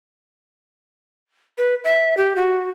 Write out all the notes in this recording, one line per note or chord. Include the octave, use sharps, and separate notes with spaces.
B4
E5
G4
F#4